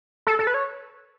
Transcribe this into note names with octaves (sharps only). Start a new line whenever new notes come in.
A4
A4
B4
C#5